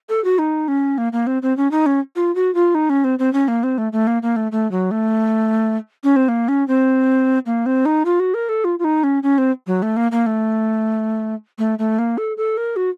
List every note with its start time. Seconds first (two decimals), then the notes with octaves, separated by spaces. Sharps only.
0.09 A4
0.24 F#4
0.38 D#4
0.68 C#4
0.98 A#3
1.12 A#3
1.27 C4
1.42 C4
1.57 C#4
1.71 D#4
1.86 C#4
2.16 F4
2.35 F#4
2.54 F4
2.75 D#4
2.89 C#4
3.04 C4
3.19 C4
3.33 C#4
3.48 A#3
3.63 C4
3.78 A3
3.92 A3
4.07 A#3
4.22 A#3
4.36 A3
4.52 A3
4.71 F#3
4.91 A3
6.04 C#4
6.16 C4
6.28 A#3
6.48 C#4
6.68 C4
7.46 A#3
7.66 C4
7.85 D#4
8.05 F4
8.20 F#4
8.34 A#4
8.49 A4
8.64 F4
8.79 F4
8.84 D#4
9.03 C#4
9.23 C#4
9.38 C4
9.67 F#3
9.82 A3
9.96 A#3
10.11 A#3
10.26 A3
11.58 A3
11.79 A3
11.99 A#3
12.17 A4
12.37 A4
12.57 A#4
12.76 F#4